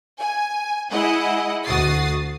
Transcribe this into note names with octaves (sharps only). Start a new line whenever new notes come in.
G#5
G#3 E4 G#4 D#5 F#5
D2 F#4 D#6 A6 C7